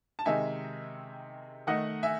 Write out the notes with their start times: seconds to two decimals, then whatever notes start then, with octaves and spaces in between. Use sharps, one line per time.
0.19 A5
0.25 C3 D#3 G#3 D#4 E5 G#5
1.67 D#3 A3 D#4 D#5 F#5
2.03 E5 G#5